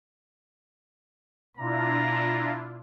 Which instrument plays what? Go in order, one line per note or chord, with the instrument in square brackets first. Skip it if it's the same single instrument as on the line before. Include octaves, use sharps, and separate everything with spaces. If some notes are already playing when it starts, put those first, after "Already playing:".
[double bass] B2 [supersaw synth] D4 E4 F4 [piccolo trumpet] A#5